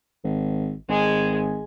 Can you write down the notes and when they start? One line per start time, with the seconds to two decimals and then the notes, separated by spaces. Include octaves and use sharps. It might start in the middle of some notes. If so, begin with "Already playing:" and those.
0.24 G#1
0.89 G#1 G#3 G#4